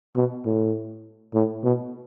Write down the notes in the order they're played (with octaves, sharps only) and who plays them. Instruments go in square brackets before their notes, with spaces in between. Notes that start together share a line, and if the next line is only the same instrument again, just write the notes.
[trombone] B2
A2
A2
B2